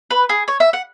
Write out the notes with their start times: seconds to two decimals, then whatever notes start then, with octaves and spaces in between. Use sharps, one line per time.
0.11 B4
0.29 G#4
0.48 C#5
0.60 E5
0.73 F#5